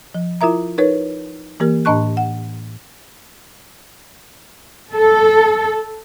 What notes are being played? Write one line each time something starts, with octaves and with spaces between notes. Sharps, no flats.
F3
E4 F4 A#4 E5 A#5
D#4 A#4 B4 C#5
E3 A#3 G4 A#4
A2 D4 D#5 A5 C#6 F#6
F#5
A4